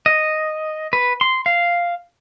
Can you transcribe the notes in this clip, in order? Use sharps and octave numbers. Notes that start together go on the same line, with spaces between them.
D#5
B4
C6
F5